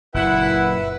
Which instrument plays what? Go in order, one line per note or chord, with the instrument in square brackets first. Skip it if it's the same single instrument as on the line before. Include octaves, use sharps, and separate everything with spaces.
[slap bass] F#1 A#2 [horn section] E4 F#5 [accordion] B4 E5